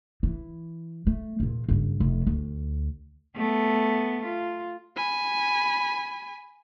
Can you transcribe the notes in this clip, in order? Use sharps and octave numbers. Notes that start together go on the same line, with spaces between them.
E3
A3
E2 A#2
F#1 G2
F1
D2
A3 B3
F4
G#5 B5